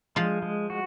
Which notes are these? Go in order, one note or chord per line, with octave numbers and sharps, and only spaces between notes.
F3 G#3 F4
G#3
F#4